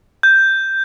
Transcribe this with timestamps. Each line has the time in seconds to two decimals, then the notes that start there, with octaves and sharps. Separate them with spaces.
0.23 G6